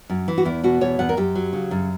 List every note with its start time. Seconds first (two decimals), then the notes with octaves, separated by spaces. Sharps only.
0.10 F#2
0.28 E3
0.38 F#4
0.45 E2 E4
0.64 B2 F#4
0.81 E2 C#5
0.99 E2 F#5
1.09 A#4
1.17 F#2 G4
1.35 F#3
1.53 C#3
1.71 F#2